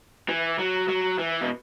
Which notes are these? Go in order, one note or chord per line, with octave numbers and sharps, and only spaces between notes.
E3
F#3
F#3
E3
B2